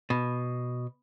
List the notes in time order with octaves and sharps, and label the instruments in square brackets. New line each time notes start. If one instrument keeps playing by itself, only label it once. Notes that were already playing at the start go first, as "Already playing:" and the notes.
[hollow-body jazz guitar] B2